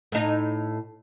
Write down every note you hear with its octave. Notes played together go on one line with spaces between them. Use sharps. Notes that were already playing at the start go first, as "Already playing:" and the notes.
A2 D#4